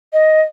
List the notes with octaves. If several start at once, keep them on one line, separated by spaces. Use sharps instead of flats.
D#5